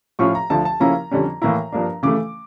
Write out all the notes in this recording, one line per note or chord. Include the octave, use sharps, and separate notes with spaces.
A2 F3 C#4 F4 C#6
A#5
D2 D3 F3 A5
A5
C#3 F3 A#3 C#4 E4 A#5
F2 D3 G3 C#4
A2 E3 A#3 E4 A#5
G2 F3 A#3 D4
C#3 E3 A3 D6